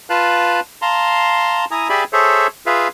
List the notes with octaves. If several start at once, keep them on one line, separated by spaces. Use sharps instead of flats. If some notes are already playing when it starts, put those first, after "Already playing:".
F4 B4 F5 A5 F#6
F5 A5 A#5 C6
E4 G#5 A#5 D#6
G4 G#4 D5 E5 G#5 B5
G#4 A4 C5 C#5 E5
F4 G#4 B4 E5 F5